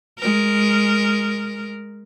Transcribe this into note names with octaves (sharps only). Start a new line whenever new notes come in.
G#3 A#4